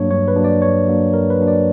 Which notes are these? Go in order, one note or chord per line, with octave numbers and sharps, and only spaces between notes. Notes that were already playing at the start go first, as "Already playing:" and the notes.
Already playing: G2 F#3 A#3 D4 C#5
G2 C#5
B4
F#3 A#3 D4
D5
G2 C#5
F#3 A#3 D4
G2 A#4
B4
F#3 A#3 D4
D5